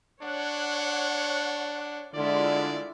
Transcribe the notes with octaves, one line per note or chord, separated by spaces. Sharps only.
D4 C#5 F#5
D3 G#3 E4 F4 D5